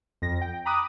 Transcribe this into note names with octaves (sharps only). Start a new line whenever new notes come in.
F2 A#6
G5
A#5 B5 D6 D#6 F#6